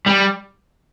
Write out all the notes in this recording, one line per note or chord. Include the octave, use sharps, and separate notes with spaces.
G3